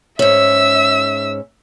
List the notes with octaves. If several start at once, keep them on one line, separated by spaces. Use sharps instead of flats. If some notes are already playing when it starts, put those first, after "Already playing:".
G#2 C#4 E5 E6